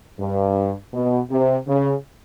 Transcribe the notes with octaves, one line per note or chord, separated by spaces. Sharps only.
G2
B2
C3
C#3